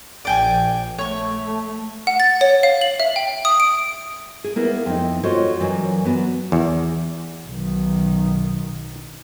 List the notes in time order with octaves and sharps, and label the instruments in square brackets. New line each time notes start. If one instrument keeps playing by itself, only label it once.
[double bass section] A#1 [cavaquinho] D5 G5 G#5
[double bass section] A3 [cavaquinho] C#5 C#6
[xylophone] F#5
A6
C#5
F5
F#7
E5
G5
D#6
D7
[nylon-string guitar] G#4
A#3 B3 E4 A#4
F2 C4 D#4
F4 F#4 A4 C5 C#5 D#5
F#2 E3 F#3 D5
F#3 B3 F#4 D5
[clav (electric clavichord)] E2
[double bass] B1 D#3